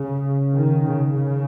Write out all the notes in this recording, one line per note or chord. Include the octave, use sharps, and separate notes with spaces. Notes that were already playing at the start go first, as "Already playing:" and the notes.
Already playing: C#3
D#3
C#3
C#3